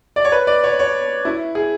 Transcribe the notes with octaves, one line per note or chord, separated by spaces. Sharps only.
D5
C#5
B4
D5
C#5
C#5
E4
G#4